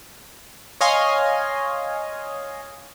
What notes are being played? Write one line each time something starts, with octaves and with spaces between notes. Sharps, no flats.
C#5 D#5 F5 G#5 C6